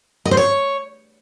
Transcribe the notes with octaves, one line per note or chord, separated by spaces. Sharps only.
D#5
C5
C#5